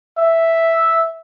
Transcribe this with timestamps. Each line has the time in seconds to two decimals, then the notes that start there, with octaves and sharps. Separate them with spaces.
0.18 E5